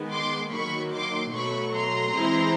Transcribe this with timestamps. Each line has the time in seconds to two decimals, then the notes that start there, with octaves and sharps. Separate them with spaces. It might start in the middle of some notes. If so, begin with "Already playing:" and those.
Already playing: D#3 G#3 B3
0.11 C6 D6
0.52 D#3 F#3 A#3 B5 C#6
0.93 C6 D6
1.33 B2 F#3 A3 B5 C#6
1.74 A#5 C6
2.15 E3 G#3 C4 E4